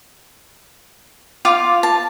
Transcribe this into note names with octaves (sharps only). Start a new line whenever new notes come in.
F4 F5 D6
A5